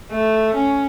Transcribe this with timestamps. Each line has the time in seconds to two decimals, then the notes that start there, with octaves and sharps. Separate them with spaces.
0.11 A3
0.55 C#4